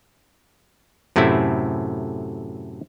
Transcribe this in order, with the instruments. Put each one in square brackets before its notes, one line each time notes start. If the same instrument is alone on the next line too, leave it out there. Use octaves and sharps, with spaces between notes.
[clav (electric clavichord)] F#2 A2 C3 A3 E4